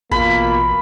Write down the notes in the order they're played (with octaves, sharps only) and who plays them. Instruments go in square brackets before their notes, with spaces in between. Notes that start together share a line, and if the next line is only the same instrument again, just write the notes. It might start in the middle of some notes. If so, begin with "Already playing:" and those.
[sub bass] A1 [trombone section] B2 A#3 F4 [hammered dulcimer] B5